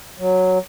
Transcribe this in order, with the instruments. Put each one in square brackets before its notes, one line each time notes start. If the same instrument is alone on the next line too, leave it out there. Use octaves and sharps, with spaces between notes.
[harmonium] F#3